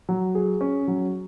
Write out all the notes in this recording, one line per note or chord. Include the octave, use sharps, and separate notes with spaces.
F#3
G#4
C#4
F#3